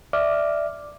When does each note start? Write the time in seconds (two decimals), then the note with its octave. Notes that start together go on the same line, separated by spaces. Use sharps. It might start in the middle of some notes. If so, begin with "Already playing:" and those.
0.13 D5 E5 D6 F6